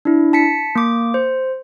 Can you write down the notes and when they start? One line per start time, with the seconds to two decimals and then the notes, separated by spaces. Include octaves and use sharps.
0.05 D4 E4
0.33 A5 B6 C#7
0.76 A#3 D6
1.14 C5